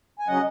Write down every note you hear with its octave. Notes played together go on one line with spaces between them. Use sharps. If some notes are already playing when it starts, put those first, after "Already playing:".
G#5
C#3 F#3 C#4 D#5 F#5